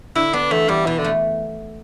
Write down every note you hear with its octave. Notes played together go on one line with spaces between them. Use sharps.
D3 E4
B3 D4
E2 A3
E2 G3
B2 E3
D3
A3